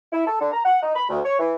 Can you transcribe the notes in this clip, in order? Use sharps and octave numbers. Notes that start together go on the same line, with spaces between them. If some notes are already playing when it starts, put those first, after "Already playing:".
E4
A4
D3
A#5
F#5
D#4
B5
D2
C#5
E3